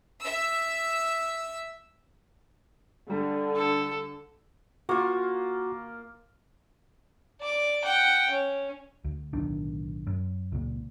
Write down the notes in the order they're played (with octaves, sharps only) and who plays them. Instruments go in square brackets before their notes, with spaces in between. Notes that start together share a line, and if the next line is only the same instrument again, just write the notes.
[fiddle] E5 E6
[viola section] D3 [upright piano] G3
[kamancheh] A4
[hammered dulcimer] A#3 F4 [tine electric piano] F#4
[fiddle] D5 D6
F#5 G5
C#4
[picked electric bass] D2
D1 B1 D#3 D4
F#2
C#2 A#2